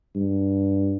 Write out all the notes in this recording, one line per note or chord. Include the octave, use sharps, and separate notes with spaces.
G2